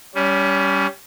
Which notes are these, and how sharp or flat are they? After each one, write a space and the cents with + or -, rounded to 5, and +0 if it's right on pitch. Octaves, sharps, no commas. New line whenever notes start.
G3 +0 C#4 +25